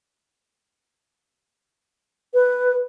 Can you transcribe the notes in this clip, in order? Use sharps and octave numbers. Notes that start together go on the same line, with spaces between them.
B4